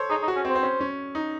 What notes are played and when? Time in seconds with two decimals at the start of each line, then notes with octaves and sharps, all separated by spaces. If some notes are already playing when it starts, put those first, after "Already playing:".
Already playing: A4 C5 C#5
0.09 D#4 G#4
0.23 D#4
0.28 F#4
0.36 C#4
0.45 C4
0.50 C5
0.55 C4
0.63 C#4
0.80 C#4
1.15 D#4